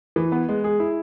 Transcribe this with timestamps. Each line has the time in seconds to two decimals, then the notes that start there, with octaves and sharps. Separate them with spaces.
0.16 E3
0.32 B3
0.49 G#3
0.64 G#4
0.80 E4